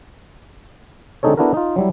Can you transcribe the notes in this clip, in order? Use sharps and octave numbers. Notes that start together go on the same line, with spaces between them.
D3 G#3 C4 D#4 A4 C#5
B3 D4 E4 F#4 A4 A#4
D#4 F4
F#3 G3 E4